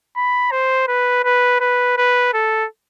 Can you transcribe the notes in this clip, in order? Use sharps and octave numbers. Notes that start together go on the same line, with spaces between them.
B5
C5
B4
B4
B4
B4
A4